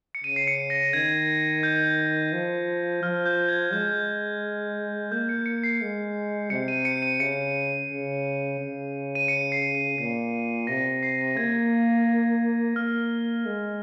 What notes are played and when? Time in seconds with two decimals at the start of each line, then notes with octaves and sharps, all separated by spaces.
0.15 C#7
0.24 C#3 D#7
0.36 C7
0.47 C#7
0.70 A#6
0.93 D#3 G#6
1.63 G6
2.32 F3
3.03 F3 F6
3.26 G6
3.49 G#6
3.73 G#3 G6
5.12 A#3 G6
5.29 C#7
5.46 C#7
5.64 C7
5.81 G#3
6.50 C3 C#7
6.68 D#7
6.85 C#7
7.03 D#7
7.19 C#3 C#7
7.90 C#3
8.59 C#3
9.15 D#7
9.28 C#7
9.52 C7
9.75 C#7
9.98 A#2 C7
10.67 C3 A#6
11.03 C7
11.37 A#3 G#6
12.76 A#3 F6
13.45 G#3